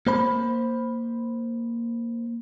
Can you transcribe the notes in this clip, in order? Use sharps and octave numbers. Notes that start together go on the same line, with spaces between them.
A#3 C5 B5